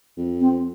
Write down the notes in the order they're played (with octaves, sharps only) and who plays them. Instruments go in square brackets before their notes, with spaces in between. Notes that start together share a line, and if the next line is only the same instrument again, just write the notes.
[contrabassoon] F2
[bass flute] C4